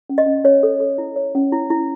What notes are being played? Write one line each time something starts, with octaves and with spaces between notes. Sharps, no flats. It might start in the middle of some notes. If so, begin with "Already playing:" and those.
C#4
D#5
C#4
C#4 C#5
A4
A4
E4
C#5
C#4
E4
E4